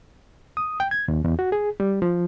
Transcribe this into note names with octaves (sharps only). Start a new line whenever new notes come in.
D#6
G5
G#6
D#2
E2
F#4
G#4
G3
F3